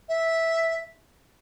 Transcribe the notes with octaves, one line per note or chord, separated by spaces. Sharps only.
E5